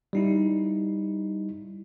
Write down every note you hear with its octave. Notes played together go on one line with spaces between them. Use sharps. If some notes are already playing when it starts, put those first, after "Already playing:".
G3 D#4 E4